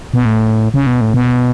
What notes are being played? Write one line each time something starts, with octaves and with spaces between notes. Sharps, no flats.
B2
A2
C#3
B2
A2
B2